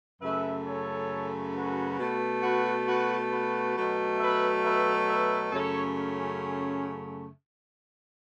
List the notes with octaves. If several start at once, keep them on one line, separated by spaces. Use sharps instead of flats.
F#2 C#3 A3 B4 E5
A4 C#5
F#4 B4
B2 A3
F#4 B4
F#4 B4
F#4 B4
B2 F#3 A3
B4 E5
B4 E5
B4 E5
F#2 C#3 A3 A4 C#5
C#4